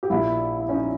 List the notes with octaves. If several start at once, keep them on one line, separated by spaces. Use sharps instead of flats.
G4
A#1 A#2 E4
E4
C#4
D#4